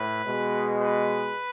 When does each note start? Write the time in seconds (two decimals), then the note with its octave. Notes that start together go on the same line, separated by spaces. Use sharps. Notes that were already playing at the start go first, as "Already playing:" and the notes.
Already playing: A2 B4
0.25 B2 G#3
0.80 B4